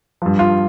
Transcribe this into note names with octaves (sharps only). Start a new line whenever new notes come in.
G2 F3
F4